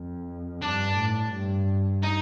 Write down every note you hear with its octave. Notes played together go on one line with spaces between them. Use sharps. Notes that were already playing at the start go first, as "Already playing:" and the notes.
Already playing: F2
G2 D4
A2
G2
D#4